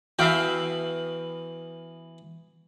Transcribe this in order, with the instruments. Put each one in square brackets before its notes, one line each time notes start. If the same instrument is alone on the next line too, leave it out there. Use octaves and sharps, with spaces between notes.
[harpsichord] E3 B3 F#4 [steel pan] E5 F5 G5